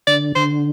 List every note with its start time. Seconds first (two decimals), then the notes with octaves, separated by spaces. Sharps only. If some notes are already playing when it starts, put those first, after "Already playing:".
0.07 D3 D5
0.35 D3 C5